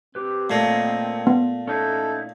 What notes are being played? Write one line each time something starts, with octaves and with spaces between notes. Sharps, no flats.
C4 G4 B4
A#2 A3 A#3 C#5 D#5
B3
C#4 D#4 E4 A4